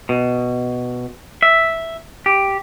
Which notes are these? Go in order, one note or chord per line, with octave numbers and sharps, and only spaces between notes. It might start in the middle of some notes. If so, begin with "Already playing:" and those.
B2
E5
G4